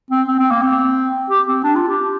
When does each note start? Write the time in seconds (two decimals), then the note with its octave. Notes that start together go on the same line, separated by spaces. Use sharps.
0.11 C4
0.28 C4
0.39 C4
0.51 A#3
0.62 C4
1.30 G4
1.48 C4
1.64 D4
1.75 F4
1.88 G4